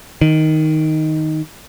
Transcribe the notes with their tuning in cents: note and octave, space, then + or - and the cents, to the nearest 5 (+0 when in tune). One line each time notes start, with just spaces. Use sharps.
D#3 +5